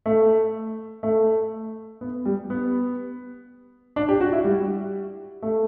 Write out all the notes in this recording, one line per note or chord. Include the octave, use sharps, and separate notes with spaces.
A3
A3
B3
G3
B3
D4
G4
F#4
E4
G3
A3